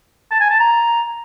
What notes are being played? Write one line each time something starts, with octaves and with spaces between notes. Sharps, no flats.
A5
G#5
A5
A#5